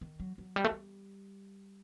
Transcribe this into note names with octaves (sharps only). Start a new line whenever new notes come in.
D#3
F#3
F#3
G3
A3
G3